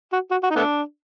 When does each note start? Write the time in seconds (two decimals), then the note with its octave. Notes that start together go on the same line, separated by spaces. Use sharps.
0.12 F#4
0.31 F#4
0.43 F#4
0.51 D#4
0.56 A3 B3 D4